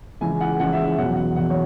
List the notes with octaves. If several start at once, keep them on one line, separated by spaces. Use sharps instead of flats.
C#2 C#3 E3 G#5
F#5
C#2 C#3 E3 F#5
E5
E5
E2 B2 F#3 F#5
F#5
E2 B2 F#3 F#5
C#5